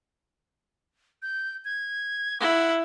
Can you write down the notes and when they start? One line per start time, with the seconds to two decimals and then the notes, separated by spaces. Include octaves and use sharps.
1.22 G6
1.65 G#6
2.41 E4 F#5